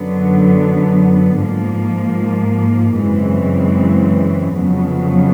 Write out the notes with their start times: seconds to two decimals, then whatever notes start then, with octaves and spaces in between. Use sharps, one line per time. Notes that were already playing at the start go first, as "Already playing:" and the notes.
Already playing: F#2 D3 F#3 B3
1.39 G#2 F3 A#3
2.99 F#2 C#3 E3 G#3 C4
4.58 F2 C#3 F#3 B3